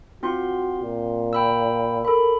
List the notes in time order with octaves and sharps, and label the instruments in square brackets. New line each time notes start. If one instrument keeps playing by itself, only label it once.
[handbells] C4 F4 C6 [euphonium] F#4
[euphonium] A#2
[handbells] G5 B5 E6
[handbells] A4 B5 [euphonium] A#4